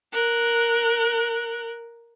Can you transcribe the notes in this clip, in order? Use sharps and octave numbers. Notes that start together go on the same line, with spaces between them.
A#4 F#6